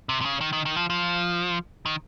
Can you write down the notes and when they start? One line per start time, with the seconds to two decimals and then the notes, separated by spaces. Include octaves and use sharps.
0.09 C3
0.21 C3
0.25 C#3
0.41 D#3
0.53 D#3
0.66 D#3
0.76 F3
0.90 F3
1.86 D#3